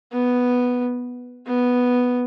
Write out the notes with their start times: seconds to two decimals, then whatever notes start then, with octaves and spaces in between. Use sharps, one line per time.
0.12 B3
1.46 B3